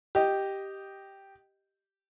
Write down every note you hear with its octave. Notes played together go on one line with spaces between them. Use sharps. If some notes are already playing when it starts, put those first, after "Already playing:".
G4 D#5